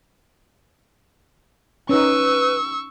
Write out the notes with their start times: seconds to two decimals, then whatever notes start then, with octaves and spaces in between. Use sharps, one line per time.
1.89 C#4 D#4 B4 C#6 E6